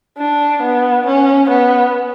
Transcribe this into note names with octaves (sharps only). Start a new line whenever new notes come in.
D4
B3
C#4
B3